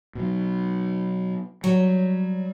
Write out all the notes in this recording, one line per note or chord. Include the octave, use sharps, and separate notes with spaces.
B2 F#3
F#3 G3